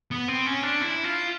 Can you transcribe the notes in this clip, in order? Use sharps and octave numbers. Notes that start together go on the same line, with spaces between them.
B3
C4
C#4
D4
E4
F4